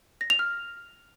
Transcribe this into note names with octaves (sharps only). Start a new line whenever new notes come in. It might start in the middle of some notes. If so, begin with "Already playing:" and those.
A#6
F7
F6